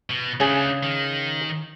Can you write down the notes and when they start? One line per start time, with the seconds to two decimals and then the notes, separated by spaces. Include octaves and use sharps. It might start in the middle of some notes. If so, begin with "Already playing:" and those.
0.10 B2
0.40 C#3 A3 D4 G#4
0.83 D#3